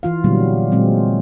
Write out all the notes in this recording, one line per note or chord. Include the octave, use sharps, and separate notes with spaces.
E3 F4 F5
A#2 D3 F#3 G3 B3
A#2 F#3 G#3 C4